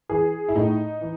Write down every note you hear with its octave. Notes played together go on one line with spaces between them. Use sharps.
E3 G#4
E4
A2 D#4
E3